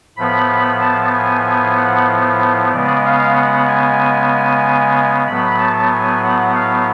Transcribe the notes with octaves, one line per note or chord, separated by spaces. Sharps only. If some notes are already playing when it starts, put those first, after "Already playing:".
A2 F3 B3 B5
A5
G#5
G#5
F#5
C#3 G#3 B3 D5
F5
F#5
G#5
A2 F#3 B3 B5
A5
G#5
F#5
F5